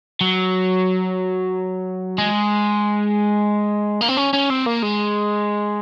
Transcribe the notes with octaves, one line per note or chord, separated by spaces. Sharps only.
F#3
G#3
A#3
C4
C#4
C#4
C4
A#3
G#3